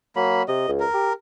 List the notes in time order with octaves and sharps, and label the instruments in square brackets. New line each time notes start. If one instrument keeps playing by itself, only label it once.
[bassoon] F#3 [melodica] A#3 B5
[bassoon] C3 [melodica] D#5
[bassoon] C#2
[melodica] A#4
[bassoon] G4